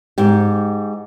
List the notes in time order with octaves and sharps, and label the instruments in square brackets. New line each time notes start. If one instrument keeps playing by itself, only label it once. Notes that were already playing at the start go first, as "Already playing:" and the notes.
[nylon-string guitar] G#2 G4